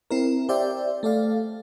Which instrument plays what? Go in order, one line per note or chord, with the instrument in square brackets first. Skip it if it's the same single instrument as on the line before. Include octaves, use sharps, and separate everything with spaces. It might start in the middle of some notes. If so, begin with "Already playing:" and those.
[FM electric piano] C4 E4 A#4
G4 C5 D5 E5 G5
A3 A4 D5 F5